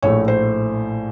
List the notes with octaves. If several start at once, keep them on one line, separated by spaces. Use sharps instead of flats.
A#1 A2 A3 C#5
C5